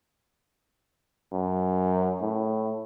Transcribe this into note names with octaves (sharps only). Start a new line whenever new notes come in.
F#2
A2